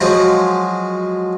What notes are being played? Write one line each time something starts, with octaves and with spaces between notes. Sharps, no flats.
F3 F#3 G#3 F#4